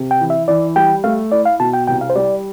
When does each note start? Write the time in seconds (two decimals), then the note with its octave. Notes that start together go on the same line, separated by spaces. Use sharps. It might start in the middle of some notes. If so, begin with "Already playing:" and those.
Already playing: C3
0.11 G5
0.20 E3
0.30 E5
0.48 E3 D5
0.76 G3 G5
1.04 A3 F5
1.32 E4 D5
1.46 F5
1.60 B2 A5
1.73 G5
1.87 C2 G5
2.01 F5
2.10 C5
2.16 G3 D5